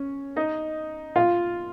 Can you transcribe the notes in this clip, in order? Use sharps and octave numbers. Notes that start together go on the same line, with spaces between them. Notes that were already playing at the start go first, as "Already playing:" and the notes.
Already playing: C#4
D#4 D#5
F4 F5